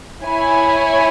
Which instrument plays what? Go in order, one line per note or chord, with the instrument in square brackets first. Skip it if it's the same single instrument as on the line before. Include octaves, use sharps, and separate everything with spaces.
[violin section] E4 C#5 G#5 [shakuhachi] B5